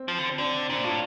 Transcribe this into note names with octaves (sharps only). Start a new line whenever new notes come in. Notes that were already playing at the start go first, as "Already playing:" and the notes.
Already playing: C4
F3
D3
C4
D3 D4
A#2 D4
A2 F4